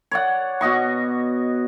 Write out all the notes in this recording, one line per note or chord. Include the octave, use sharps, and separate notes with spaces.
C#5 D5 F#5
B2 F#4 D#5 C#6